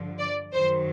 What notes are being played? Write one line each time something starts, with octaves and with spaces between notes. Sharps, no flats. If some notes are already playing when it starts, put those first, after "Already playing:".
Already playing: G2 D3 F3
D5
F#2 D#3 F#3 C5